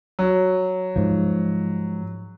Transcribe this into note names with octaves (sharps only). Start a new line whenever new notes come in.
F#3
G#2 F3